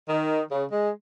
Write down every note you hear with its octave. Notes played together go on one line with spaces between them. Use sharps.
D#3
C#3
G#3